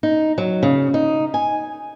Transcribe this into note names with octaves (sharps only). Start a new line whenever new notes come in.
D#4
F#3
C#3
D#4
G#5